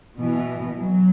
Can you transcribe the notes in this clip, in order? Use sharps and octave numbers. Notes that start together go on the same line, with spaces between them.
B2 E3
F#3